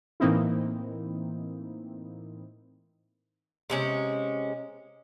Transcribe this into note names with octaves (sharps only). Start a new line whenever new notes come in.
A2 E3 A#3 C4 D#4 E4
C3 G#3 C#4